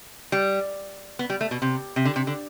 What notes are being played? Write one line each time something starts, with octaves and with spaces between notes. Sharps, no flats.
G3
B3
G3
A3
B2
C3
C3
D3
C3
D3